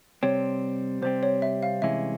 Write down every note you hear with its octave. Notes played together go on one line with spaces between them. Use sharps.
C3 G3 C4 C#5
C3 G3 C4 C5
C#5
E5
F5
C2 C3 E3 G#3 C#4 E5